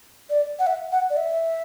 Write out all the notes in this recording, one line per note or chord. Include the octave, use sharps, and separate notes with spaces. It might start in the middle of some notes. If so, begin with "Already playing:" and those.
D5
F#5
E5
F#5
D5
E5